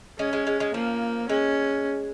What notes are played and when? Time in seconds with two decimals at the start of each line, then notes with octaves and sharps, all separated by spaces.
0.19 G#3 C#4
0.33 G#3
0.47 G#3
0.60 G#3
0.74 F3 A#3
1.29 G#3 C#4